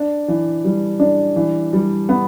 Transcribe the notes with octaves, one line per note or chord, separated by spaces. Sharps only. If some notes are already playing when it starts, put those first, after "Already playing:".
Already playing: D4
E3
G3
D4
E3
G3
B3